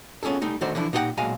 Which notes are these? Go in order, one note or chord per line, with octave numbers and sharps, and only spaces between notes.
B3 C#4 F4 G#4 A4
G3 A3 D#4
D3 D#3 A3 F#4 C5 D5
D3 E3 F3 D4 E4
A#2 D#4 G4 G#4 F#5 G5
B1 A#2 G#3 F#4 F5 G#5